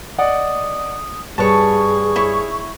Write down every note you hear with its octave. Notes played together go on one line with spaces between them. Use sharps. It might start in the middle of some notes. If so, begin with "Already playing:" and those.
D5 D#5 F#5 D#6
G2 G#4 B4 C#5 A5 C#6
E4 C#5